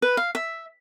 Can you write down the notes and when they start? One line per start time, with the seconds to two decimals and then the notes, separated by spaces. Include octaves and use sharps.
0.02 B4
0.17 F5
0.35 E5